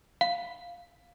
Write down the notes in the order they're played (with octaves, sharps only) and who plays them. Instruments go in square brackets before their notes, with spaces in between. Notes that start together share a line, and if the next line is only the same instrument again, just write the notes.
[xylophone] F5